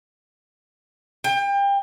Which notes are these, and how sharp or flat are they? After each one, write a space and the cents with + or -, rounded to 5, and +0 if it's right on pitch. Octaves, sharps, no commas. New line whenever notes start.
G5 +30